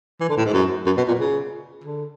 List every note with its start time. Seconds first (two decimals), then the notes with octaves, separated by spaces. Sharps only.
0.20 E3
0.29 D3
0.37 A2
0.45 G#2
0.53 F#2
0.86 F#2
0.97 B2
1.08 A#2
1.19 C#3
1.84 D3